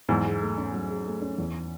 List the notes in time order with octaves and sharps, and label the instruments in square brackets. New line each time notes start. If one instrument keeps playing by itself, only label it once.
[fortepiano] E2 G#2 [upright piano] F#3
[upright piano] G#4
A3
C#4
F#3
G#4
A3
C#4
E2